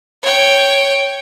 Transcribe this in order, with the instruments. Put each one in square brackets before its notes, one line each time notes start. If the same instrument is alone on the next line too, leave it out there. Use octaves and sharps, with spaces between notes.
[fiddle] C#5 G5